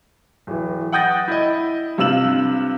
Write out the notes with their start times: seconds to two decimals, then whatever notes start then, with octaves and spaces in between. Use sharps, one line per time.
0.47 D1 E3
0.92 F#5 G5 D#6 G6 A6 A#6
1.28 E4 D#5
1.98 G2 C3 F4 E6 E7 F#7